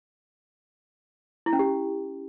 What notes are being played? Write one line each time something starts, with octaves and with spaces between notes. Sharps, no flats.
E4
C#4
G4